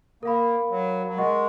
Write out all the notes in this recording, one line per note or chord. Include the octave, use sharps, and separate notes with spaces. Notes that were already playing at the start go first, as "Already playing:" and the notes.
A#3 A#4 F5 B5
F#3
F#3
G#3 A#4 D#5 F#5 C#6